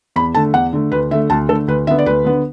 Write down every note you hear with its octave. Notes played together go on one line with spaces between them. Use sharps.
E2 B5
D3 A3 A5
E2 F#5
D3 A3
D2 B4
D3 A3 E5
D2 A5
D3 A3 A4
D2 B4
D3 B3 E5
D5
D2 B4
D3 B3